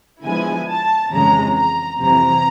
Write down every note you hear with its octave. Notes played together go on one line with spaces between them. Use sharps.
D3 F3 G#3 B3 E4 G#5
A5
F2 C#3 E3 G#3 C#4 A#5
A#5
F2 C3 E3 A#5